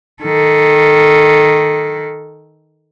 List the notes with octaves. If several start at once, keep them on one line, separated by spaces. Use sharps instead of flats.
D#3 A4